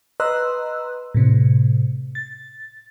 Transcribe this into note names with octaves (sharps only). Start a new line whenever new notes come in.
B4 D#5 A#5 C6 E6 F#6
A2 C3
A6